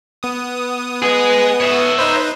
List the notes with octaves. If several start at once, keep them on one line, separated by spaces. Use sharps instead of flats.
B3 D#6
G#4 B4 D#5
C#5 E5
D#4 B4 C5